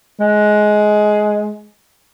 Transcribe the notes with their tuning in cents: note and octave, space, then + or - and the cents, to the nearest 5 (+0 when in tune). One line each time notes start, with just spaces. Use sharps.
G#3 +15